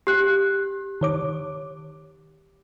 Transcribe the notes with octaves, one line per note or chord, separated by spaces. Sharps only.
G4 F#6
D#3 C#5 D6